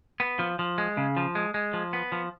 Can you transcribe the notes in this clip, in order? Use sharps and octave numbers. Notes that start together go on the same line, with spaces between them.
B3
F3
F3
G#3
C#3
F3
G#3
G#3
F3
B3
F3